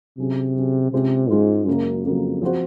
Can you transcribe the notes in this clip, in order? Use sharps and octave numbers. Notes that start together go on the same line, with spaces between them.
C3 F#3 C#4 G#4
F#3 C#4 G#4
C3 G#3 C#4 F4 C5
G#2 G#3 C#4 F4 C5
F#2 C#3 F#3 A#3
F2 C#3 F#3 A#3
F3 C4 F#4 C5